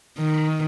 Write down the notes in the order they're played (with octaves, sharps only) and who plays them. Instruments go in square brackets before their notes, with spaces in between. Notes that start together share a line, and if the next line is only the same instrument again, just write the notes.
[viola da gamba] D#3